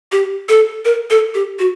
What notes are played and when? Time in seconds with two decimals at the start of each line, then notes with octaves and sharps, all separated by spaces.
0.12 G4
0.49 A4
0.85 A#4
1.10 A4
1.34 G4
1.59 F#4